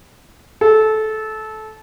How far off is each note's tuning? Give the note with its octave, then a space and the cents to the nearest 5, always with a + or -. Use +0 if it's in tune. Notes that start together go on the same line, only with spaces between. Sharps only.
A4 -20